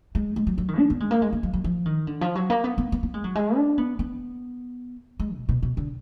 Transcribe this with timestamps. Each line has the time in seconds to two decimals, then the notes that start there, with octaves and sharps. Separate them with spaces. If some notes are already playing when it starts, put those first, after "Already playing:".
0.15 G#3
0.36 G#3
0.47 F#3
0.58 F#3
0.68 D#3
0.78 D4
0.90 B3
1.00 G#3
1.11 A#3
1.22 G#3
1.33 A#3
1.43 F#3
1.53 F#3
1.64 F3
1.86 D#3
2.07 D3
2.21 F3
2.35 F#3
2.50 A#3
2.64 B3
2.78 B3
2.92 B3
3.03 B3
3.14 G#3
3.24 F#3
3.35 G#3
3.56 D4
3.78 B3
3.99 B3
5.20 G#3
5.35 B2
5.49 B2
5.63 B2
5.77 D3